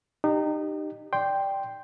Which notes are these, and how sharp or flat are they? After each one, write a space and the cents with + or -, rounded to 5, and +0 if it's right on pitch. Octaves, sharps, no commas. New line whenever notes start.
D#4 -25 G4 +0
D5 +0 G5 +0 C6 +0